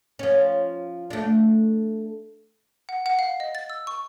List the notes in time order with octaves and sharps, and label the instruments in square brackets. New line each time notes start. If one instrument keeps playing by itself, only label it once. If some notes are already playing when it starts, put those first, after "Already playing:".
[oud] F3 C#4
A3 D4
[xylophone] F#5
F#5
F5
D#5
A6
E6
C#6